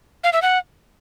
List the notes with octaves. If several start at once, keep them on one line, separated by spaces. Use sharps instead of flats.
F5
E5
F#5